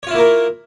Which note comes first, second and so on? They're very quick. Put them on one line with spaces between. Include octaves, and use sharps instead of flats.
C#5 F4 E4 A#3 A#4